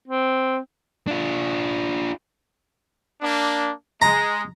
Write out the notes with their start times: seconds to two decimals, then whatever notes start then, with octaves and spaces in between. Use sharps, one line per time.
0.07 C4
1.07 D4 F4
3.21 A#3 D4
4.02 G#3 A#5